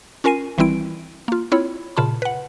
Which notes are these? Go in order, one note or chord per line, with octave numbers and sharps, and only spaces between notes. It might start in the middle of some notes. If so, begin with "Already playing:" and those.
C#4 F4 A#4 G#5 C7 D#7
G#1 E3 G3 C4 E4 D7
A#3 F4
C4 E4 F4 C#5 B5
A#2 C#3 F4 A5 B5
B4 F#5